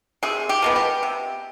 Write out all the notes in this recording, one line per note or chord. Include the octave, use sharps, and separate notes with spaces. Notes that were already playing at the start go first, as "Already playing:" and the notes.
C3 G#4
G4
F3 G#3 B3
G4
C3